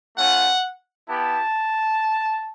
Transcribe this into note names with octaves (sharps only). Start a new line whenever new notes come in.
A3 C#4 F4 F#5
B3 E4 G4 A5